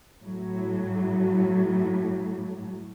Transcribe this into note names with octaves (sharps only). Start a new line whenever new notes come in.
A2 F#3